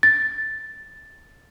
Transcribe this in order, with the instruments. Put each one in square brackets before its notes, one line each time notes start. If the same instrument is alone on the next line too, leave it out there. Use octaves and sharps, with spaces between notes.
[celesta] A6